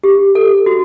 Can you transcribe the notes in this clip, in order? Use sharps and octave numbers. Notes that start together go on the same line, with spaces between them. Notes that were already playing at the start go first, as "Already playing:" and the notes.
G4
A4
F#4